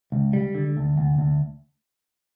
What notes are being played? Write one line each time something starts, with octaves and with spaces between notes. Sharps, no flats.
C#2
G3
D3
D2
D2
D2